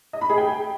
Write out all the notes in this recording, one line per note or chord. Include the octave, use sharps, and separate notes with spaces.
D#5
B5
G#4
G5